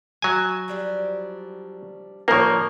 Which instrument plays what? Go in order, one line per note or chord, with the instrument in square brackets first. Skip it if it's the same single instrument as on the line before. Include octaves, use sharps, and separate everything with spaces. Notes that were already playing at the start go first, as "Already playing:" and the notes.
[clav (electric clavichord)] F#3 G#5 [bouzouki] A3
[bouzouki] F3 G3 D4
[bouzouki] A2 D3 G3 [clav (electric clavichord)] F3 A#3 [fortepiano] A#4 C#5